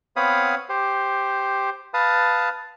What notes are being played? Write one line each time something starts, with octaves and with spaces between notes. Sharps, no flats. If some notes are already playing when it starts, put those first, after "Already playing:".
B3 C4 C#5 F5 B5 D#6
G4 C5
B4 F5 A5 D#6